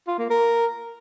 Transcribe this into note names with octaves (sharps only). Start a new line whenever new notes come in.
F4
A#3
A#4